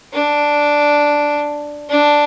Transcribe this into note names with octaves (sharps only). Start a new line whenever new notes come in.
D4
D4